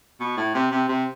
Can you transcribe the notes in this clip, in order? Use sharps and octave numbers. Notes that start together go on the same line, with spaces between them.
B2
A2
C3
C3
C3